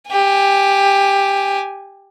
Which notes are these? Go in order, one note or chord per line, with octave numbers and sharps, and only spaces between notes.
G4 G#5